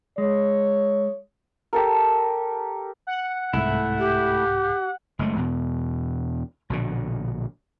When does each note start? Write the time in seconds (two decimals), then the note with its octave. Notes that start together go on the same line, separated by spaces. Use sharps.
0.18 G#3 C#5
1.73 G4 A4 A#4
3.07 F#5
3.53 C2 G#2 A3 E4
3.99 G4
5.19 F#1 G#3 A3
5.36 E2 B2
6.70 A#1 B2 D3